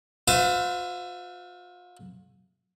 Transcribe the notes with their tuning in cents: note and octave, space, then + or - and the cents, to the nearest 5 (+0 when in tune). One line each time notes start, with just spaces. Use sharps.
F4 +40 C5 -40 E5 +20